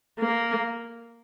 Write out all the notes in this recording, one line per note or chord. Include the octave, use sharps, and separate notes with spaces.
A#3